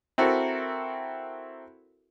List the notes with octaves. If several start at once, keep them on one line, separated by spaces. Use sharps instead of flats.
C4 E4 F#4 A4 A#4